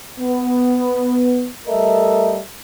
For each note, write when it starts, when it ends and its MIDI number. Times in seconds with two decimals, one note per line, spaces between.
0.20 1.49 59
1.68 2.40 55
1.68 2.40 57
1.68 2.40 69
1.68 2.40 70
1.68 2.40 75
1.68 2.40 76